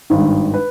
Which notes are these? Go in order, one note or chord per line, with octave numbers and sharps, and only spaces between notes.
G#1 G2 D#3
B4